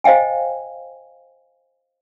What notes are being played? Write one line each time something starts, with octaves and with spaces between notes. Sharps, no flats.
C5 D#5 F5 G5 G#5